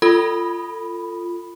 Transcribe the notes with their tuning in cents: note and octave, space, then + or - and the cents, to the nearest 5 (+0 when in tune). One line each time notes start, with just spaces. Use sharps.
F4 -5 A4 +25 B5 +0